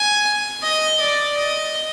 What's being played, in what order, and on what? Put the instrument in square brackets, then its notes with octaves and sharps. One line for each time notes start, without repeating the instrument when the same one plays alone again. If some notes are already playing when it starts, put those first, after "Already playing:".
Already playing: [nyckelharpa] G#5
D#5
D5
D#5